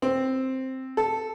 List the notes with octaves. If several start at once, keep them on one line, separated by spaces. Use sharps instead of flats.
C4
A4